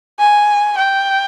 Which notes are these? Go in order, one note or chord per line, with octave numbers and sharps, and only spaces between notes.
G#5
G5